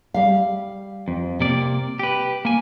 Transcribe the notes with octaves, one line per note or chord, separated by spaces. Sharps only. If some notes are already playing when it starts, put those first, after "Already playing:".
G3 F5
F2
C3 A#3 D5
G4 B4
A#3 G#5